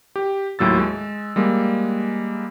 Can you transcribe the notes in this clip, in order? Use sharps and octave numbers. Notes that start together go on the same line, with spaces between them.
G4
D#2 A2 F#3 E6 A6
G#3
G3 G#3 A#3